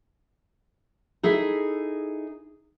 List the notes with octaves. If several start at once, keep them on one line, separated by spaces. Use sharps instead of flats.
D#4 E4 G#4 A4 E5